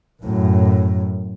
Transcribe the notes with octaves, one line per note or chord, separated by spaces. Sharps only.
F#2 A2